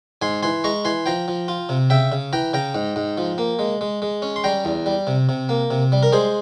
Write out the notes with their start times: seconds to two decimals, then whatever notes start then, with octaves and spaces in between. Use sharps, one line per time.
0.22 G#2 G#5 C6
0.43 E3 G#5 C6
0.64 G#3 A#5 C#6
0.85 E3 G#5 C6
1.06 F3 G5 A#5
1.28 F3
1.48 F4
1.69 C3
1.90 C#3 E5 G5
2.12 C#3
2.33 E3 G5 A#5
2.53 C#3 G5 A#5
2.75 G#2
2.96 G#2
3.18 F3
3.38 A#3
3.59 G#3
3.81 G#3
4.02 G#3
4.22 C#4
4.36 C6
4.44 G3 G5 A#5
4.65 E2
4.86 G3
5.07 C3
5.29 C3
5.49 A#3
5.70 C3
5.92 G3
6.03 A#4
6.12 G#3 G#4 C5